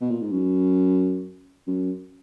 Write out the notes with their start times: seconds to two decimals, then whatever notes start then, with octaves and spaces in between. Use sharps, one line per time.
0.01 B2
0.11 A#2
0.22 G#2
0.32 F#2
1.67 F#2